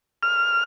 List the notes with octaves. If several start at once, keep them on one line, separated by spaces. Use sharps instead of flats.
F6